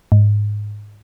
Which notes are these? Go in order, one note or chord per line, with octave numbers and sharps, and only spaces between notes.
G#2